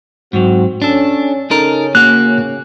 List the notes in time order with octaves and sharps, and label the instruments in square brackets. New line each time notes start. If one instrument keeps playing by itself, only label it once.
[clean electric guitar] G#2 F#3 [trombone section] C4 F#4
[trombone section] C#4 [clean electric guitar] D4 A4
[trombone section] C#3 C#4 [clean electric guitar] D#4 A4 A#4
[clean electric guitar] A#3 F#4 [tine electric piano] F#6